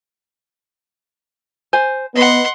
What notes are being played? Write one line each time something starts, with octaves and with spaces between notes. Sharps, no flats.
C5 G#5
B3 D#5 F#5 C6